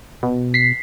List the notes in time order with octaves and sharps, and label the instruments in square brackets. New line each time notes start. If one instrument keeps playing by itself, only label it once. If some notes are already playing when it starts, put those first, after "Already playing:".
[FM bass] B2
[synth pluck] B6 C7